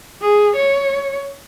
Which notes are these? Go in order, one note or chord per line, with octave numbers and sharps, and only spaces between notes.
G#4
C#5